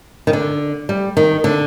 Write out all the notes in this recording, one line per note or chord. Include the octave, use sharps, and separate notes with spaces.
D#3
D3
G3
D#3
D3